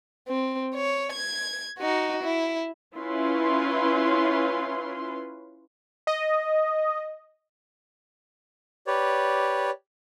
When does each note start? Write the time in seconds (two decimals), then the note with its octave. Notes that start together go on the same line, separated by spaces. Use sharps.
0.29 C4
0.75 C#5
1.13 G#6
1.79 D#4 F#4
2.24 E4
2.98 C#4 E4 F4 B4 C6
6.07 D#5
8.87 G4 B4 C#5 D5